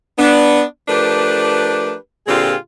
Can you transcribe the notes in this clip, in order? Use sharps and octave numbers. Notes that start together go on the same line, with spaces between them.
B3 D4
F3 A3 D4 G4 A#4 B4
A#2 D3 C4 F4 G4 G#4